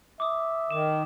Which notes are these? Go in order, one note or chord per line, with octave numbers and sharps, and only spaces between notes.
E5 D6 D#6
D#3 D6 E7